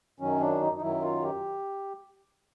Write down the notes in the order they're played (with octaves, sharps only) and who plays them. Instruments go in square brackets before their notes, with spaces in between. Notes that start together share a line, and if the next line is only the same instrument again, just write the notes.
[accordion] F#2 D#3 F#3 C#4
D4
D#4
D#4
F#2 D#3 F#3 E4
F4
G4